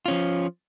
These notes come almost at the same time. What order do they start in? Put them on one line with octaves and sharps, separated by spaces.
F4 C#4 F3